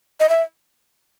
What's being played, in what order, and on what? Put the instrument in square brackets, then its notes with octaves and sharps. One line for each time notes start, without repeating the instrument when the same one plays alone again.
[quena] D#5
E5